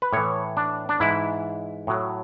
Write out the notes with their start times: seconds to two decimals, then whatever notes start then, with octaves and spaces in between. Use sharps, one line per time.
0.02 B4
0.13 A2 E3 C#5
0.57 D4
0.89 D4
1.00 G#2 E3 E4
1.87 A2 F#3